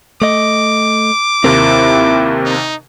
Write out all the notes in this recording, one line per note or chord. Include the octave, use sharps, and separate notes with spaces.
A3 D#5 D6
D#2 C3 C4 E4 A#4
D#4